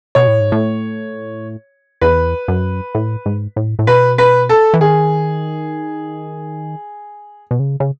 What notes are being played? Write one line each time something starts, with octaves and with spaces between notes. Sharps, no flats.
B2 C#5
A2
G#2
A2
E2 B4
F#2
A2
G#2
A2
A2
B2 B4
B4
A4
E3
D#3 G#4
B2
C#3
C#3